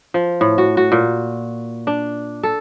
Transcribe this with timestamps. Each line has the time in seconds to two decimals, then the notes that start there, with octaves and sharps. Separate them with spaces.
0.14 F3
0.41 A2
0.58 F#4
0.77 F#4
0.92 A#2
1.87 D4
2.43 A4